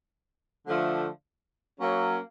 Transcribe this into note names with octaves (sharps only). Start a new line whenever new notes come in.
D3 F3 A3
F#3 A#3 C#4